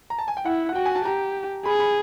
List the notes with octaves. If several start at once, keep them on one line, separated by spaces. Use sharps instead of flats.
A#5
A5
G#5
G5
E4 F#5
F#5
F#4 G5
G#5
A5
G4 A#5
G#4 B5
B5